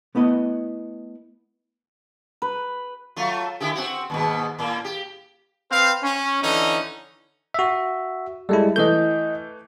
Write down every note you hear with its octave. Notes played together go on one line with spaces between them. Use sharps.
A3 B3 E4 D#5
B4
F#3 A3 F4
D3 E4 G4
C4 F#4
D#2 G#2 B2
A2 A#3
G4
C4 B4 F5
C#4
D3 E3 C#4 D#4
F#4 E5
G3 G#3 E4 A4
E3 A3 D#5 G6